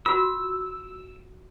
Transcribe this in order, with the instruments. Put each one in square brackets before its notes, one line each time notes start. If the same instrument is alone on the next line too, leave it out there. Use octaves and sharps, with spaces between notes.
[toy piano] F4 F#4 [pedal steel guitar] E6